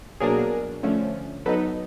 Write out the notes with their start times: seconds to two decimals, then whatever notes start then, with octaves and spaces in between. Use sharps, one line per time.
0.20 B2 F#3 A#3 D4 G#4 A#4
0.83 D3 F3 A3 C#4
1.46 F#3 B3 D#4 A4 B4